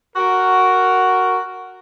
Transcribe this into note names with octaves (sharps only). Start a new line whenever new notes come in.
F#4 A#4